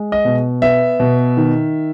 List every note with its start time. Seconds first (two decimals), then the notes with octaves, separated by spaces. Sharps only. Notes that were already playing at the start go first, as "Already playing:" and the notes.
Already playing: G#3
0.12 D#5
0.25 B2
0.62 B3 E5
1.00 B2
1.37 D#3